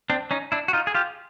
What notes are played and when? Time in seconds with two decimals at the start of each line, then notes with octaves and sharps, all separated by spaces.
0.10 C4 D4
0.31 C#4 D#4
0.52 D4 E4
0.68 F#4
0.73 D#4 F4
0.87 G#4
0.95 F4 G4